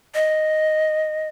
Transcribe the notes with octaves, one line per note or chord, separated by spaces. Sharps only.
D#5